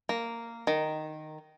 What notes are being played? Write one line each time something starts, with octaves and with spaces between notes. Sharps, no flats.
A#3
D#3